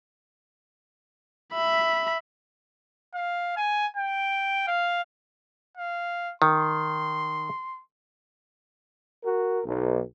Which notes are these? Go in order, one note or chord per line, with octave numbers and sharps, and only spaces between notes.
E5 B5
F5
G#5
G5
F5
F5
D#3 C6
F#4 A#4
B1